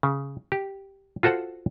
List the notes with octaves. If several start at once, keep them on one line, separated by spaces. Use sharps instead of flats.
C#3
G4
F4 F#4 A4 C5 F#5